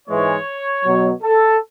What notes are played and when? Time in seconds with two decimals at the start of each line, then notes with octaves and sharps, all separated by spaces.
0.08 G#2 E3 G#3 C#5
0.84 B2 F#3
1.22 A4